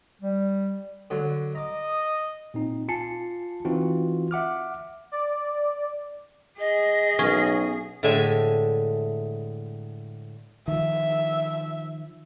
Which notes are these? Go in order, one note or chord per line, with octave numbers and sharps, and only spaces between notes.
G3
D3 F#3
D#5 A#5 D6
A#2 C4 D#4
F4 G#5 A5 C7 C#7
E3 C4 D#4 F4 F#4
E5 F#5 D6 F6
D5
G#4 D#5
B1 C#4
A2 D3 G#3 A3 E5 G#5
D#3 F3 E5